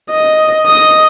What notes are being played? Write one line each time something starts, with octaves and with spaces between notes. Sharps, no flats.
D#5
D#5 D#6